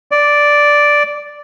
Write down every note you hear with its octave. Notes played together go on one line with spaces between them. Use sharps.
D5